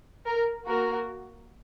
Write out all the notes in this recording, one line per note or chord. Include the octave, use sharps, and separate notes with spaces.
A#4
A#3 F#4 A#4